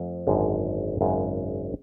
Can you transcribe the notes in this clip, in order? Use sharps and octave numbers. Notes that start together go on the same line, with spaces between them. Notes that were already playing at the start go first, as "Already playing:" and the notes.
Already playing: F2 F3 A3
G#1 F#2 D3 G#3
G#1 F#2 C#3 G#3